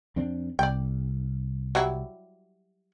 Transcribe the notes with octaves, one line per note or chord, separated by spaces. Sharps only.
F2 C4 D4
C2 D5 G5
F#3 G3 E4